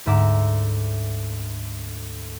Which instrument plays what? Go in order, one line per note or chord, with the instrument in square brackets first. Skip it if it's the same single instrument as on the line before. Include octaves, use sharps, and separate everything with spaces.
[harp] D2 G#2 E5 A#5 D6